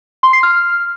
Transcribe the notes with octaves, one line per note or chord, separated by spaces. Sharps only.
C6
C7
F6